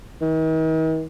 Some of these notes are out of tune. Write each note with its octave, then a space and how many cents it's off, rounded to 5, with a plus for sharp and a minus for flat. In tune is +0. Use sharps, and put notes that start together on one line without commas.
D#3 +45